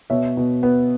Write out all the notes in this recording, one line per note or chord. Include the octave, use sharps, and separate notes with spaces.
B2 C#5 E5
B2
B3